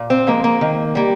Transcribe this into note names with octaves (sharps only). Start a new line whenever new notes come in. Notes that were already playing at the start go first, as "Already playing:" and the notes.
Already playing: A#2
C4
F3 G#3 A#3
A#3
D#3
G3 A#3